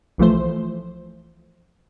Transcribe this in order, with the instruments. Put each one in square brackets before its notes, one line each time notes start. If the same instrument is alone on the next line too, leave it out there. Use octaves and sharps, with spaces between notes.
[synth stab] B1 E3 F3 A3 C5